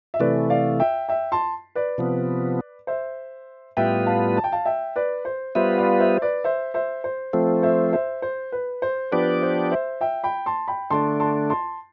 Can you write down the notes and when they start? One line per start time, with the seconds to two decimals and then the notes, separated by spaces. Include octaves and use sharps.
0.14 E5
0.20 C3 E3 A3 B4 D5
0.50 D5 F5
0.80 E5 G5
1.09 E5 G5
1.32 A5 C6
1.75 B4 D5
1.98 C3 F3 B3
2.87 C5 E5
3.77 A2 G3 B3 F4 B4 E5 G5
4.06 F5 A5
4.37 A5
4.44 G5
4.52 F5 A5
4.65 E5 G5
4.96 B4 D5
5.25 C5
5.55 G3 B3 F4 B4 C5 E5
5.78 D5 F5
6.00 C5 E5
6.22 B4 D5
6.44 C5 E5
6.74 C5 E5
7.04 C5
7.33 F3 A3 C4
7.63 C5 E5
7.93 C5 E5
8.22 C5
8.52 B4
8.82 C5
9.12 F3 B3 D4 G4 B4 D5
9.42 C5
9.71 C5 E5
10.01 E5 G5
10.24 G5 B5
10.46 A5 C6
10.68 G5 B5
10.90 D3 A3 D4 A5 C6
11.20 A5 C6
11.50 A5 C6